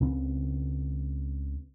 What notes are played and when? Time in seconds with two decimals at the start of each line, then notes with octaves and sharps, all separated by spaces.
0.01 C#2 C#3 C4